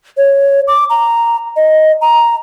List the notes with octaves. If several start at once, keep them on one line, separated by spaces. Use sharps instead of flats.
C#5
D6
A#5
D#5
A#5